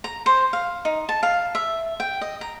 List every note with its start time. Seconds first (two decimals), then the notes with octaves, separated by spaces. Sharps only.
0.04 A#5
0.26 C5
0.53 F5
0.85 D#4
1.09 A5
1.23 F5
1.55 E5
2.00 G5
2.21 D#5
2.41 A#5